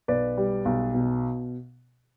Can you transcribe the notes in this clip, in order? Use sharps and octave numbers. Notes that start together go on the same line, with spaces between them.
B1 B4 D5
G3
B1
B2